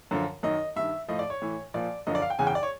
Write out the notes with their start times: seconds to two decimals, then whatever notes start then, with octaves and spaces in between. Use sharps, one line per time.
0.11 F#2 D3 F3
0.43 F#2 D#3 D#5
0.76 G2 D#3 E5
1.08 A2 F3 D#5
1.19 D5
1.30 C#5
1.42 A2 E3
1.74 A#2 F3 D5
2.07 F#2 D3 F3 D#5
2.15 D5
2.22 F5
2.30 G5
2.39 E2 C#3 E3 G#5
2.47 G5
2.55 D5
2.63 C#5